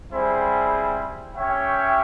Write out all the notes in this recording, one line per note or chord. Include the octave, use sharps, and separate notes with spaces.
G3 C4 E4 G#4 C5
C#4 G4 C#5 E5 G5